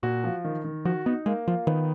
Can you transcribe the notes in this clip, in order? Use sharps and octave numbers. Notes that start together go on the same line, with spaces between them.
A#2 F#4
F3
D#3
D#3
F3 F#4
B3 D#4
G#3 A#3
F3 F4
D#3 B3